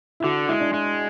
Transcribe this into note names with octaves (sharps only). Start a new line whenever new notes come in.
E4
D3 F#4
G#3 E4
D4
G#3 E4